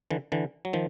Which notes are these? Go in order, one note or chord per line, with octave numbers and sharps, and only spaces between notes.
D3 E3
D3 E3
F#3
D#3 F3